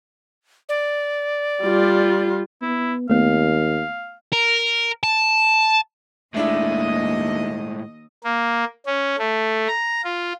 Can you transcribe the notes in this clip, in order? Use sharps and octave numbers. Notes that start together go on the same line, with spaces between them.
D5
G3 F4
B3 E4
D#2 A3 B3 F5
A#4
A5
D#2 A2 G#3 A3 D4 E4 D#5
A#3
C#4
A3
A#5
F4